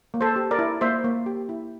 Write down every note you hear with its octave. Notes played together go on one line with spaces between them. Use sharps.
A#3
A4 C5
G4
A#4 D5
E4
A#3 C5 E5
A#3
G4
E4